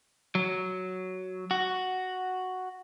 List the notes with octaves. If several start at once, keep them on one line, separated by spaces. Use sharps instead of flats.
F#3
F#4